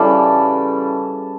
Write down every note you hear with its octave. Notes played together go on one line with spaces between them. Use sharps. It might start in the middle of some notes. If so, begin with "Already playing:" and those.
Already playing: C#3 E3 G3 E4 A4